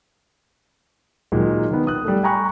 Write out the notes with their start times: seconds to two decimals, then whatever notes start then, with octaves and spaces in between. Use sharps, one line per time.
1.32 A#2 D#3 F#3 G#3
1.71 D#3 B3
1.87 D#6 F#6
2.05 G3 A3
2.23 G5 G#5 A#5 B5 C#6 F#6